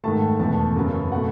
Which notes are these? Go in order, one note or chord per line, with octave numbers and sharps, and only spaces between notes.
G#2 D#3 A3 A5
E2 B2 A3 A5
F#2 C#3 F#3 B3
B2 A3 F#5